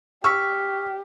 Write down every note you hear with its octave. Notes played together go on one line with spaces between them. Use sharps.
G4 C#6 E6 F6 B6